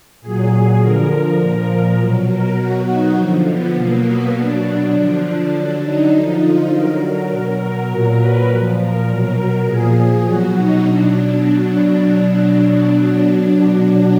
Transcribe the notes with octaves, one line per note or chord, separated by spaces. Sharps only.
A#2 F#3 G#4
D3 F3 A#4
A#4
A#2 F3 A#4
A#4
B2 F#3
A#4
B2 F#3 F#4
D#4
D3 F3
B3
B2 F#3 A#3
B3
B2 F#3 D4
D4
D3 F3 D4
D3 F#3
D#4
D3 F3 D#4
F4
D3 F#3 A#4
B2 F#3 A#4
A#4
A#2 F#3 A#4
B4
A#2 F3
A#4
B2 F#3
A#4
A#2 F3 G#4
B2 F#3 F#4
D#4
B2 F#3 D4